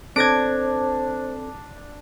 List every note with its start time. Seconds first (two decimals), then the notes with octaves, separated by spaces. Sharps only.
0.16 C4 D4 A4 C5 G#6 A#6 D7